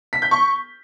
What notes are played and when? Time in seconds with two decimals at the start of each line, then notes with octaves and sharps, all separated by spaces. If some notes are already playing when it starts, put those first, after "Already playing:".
0.13 B6
0.22 G6
0.31 C#6